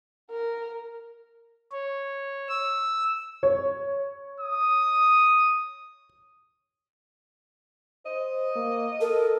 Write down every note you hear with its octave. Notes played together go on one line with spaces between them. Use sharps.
A#4
C#5
E6
C#5
D#6
C5 D#5
A#3
A4 A#4